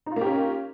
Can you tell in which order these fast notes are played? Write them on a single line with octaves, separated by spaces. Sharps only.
D#4 F4 A#3 G4 C#4